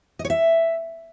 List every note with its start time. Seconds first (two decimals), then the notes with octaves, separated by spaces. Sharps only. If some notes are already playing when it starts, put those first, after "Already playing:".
0.19 D#5
0.25 C#5
0.30 E5